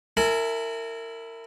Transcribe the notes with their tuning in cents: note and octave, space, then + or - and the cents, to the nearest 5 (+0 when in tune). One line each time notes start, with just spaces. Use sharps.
E4 +0 A#4 -30 G#5 +30